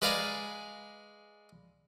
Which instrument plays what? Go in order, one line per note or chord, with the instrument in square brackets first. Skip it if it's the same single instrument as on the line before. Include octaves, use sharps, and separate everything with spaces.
[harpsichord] G#3 B4 D5 F5 G#5 A#5